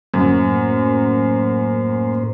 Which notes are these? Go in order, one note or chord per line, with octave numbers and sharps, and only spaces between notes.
F#2 A2 A#3 C5